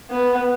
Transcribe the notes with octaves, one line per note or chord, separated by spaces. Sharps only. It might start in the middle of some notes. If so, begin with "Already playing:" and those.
B3